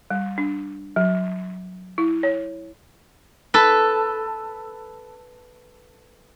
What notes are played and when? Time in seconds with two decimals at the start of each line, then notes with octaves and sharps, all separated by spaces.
0.10 G3
0.38 D4
0.96 F#3
1.98 E4
2.23 C#5
3.54 A4 B4